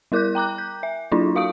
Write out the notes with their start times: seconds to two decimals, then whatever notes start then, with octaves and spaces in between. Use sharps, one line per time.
0.12 G3 E4 A#4 D6 F#6 G6
0.35 G5 A#5 D6 F#6
0.58 G6
0.83 E5
1.12 F#3 D4 E4 F4
1.36 F#4 F5 C#6 D#6 D7